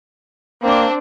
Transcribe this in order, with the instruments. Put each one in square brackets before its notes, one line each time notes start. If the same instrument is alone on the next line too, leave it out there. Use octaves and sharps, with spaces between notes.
[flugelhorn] A#3 [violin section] C4 D4